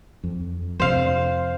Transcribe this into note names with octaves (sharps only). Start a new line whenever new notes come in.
F2
F2 C3 C5 F5